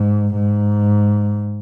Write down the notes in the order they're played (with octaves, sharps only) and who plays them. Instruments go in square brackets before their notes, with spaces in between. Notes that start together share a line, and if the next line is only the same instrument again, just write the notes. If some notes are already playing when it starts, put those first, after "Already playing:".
Already playing: [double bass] G#2
G#2